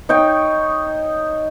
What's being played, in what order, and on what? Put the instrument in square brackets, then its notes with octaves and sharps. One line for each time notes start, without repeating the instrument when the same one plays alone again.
[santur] D#4 C#5 G5